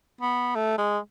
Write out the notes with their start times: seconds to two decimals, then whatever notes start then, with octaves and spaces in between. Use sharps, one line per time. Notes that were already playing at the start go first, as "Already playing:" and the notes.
0.21 B3
0.55 A3
0.78 G#3